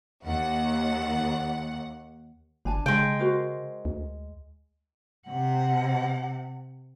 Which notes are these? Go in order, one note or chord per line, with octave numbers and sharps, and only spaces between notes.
D#2 F#5
G1 D4 G#5 A5
C#3 G#3 G5
F#4 A#4 C5
D2
C3 F#5